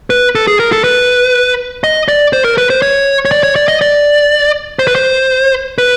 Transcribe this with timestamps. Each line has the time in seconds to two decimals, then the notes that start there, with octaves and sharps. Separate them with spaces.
0.10 B4
0.35 A4
0.47 G#4
0.60 A#4
0.72 A4
0.84 B4
1.84 D#5
2.08 D5
2.33 C5
2.44 A#4
2.58 B4
2.70 C5
2.82 C#5
3.25 C#5
3.31 D5
3.43 C#5
3.56 D5
3.68 D#5
3.81 D5
4.79 C5
4.87 B4
4.95 C5
5.78 B4